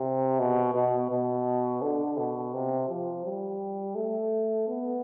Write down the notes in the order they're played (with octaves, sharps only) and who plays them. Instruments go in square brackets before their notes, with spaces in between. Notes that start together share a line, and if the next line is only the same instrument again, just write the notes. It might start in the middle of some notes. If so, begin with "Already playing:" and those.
Already playing: [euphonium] C3
B2
B2
B2
D3
B2
C3
F3
G3
A3
B3